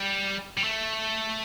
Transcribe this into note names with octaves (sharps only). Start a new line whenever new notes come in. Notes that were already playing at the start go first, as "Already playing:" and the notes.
Already playing: G3
G3
A3